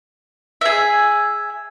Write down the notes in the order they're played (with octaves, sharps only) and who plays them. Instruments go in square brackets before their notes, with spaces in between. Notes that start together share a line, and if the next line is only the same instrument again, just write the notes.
[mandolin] G#4 E5